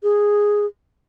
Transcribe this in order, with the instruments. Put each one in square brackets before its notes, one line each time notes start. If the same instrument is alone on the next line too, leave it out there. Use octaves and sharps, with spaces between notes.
[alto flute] G#4